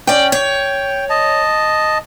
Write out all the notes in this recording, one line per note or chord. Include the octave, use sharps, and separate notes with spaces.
C#4 D5 G5
C#5 G5
D#5 A5